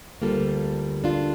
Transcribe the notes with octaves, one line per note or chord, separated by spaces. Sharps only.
D2 D3 G3 A#3 F4 A4
D4 F4